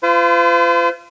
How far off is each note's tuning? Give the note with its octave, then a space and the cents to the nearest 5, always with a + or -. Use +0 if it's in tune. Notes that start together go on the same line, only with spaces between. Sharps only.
F4 -25 C5 -45